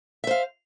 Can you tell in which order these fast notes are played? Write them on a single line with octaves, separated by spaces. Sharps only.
E5 C5 F5